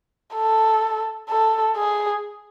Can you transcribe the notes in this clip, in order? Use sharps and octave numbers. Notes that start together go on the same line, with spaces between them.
A4
A4
G#4